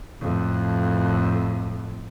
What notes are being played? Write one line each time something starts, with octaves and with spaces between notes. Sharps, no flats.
F2 A2